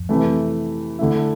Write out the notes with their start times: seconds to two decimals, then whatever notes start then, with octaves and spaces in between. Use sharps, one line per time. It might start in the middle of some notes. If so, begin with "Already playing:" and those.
Already playing: F2
0.09 C3 E3 A3
0.99 D3 A3 E4